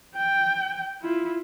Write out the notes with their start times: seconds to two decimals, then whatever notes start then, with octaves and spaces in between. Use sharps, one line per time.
0.16 G5
1.02 E4 F4